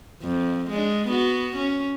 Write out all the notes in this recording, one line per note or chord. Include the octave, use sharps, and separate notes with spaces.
F2
G#3 D4
B3 F#4
C#4